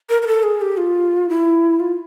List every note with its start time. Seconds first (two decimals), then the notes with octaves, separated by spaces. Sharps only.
0.09 A#4
0.22 A#4
0.27 A4
0.43 G#4
0.61 G4
0.77 F4
1.29 E4
1.80 F4